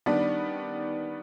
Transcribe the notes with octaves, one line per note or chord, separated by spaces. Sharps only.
D#3 G3 B3 D4